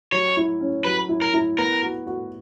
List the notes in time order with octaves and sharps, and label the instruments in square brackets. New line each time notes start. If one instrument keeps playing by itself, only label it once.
[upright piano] F#3 [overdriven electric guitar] C#5
[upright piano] E4
C#4
[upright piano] F#3 [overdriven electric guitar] B4
[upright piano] E4
[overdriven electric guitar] A#4
[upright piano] E4
[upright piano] B3 [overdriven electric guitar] A#4
[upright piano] F#4
F#4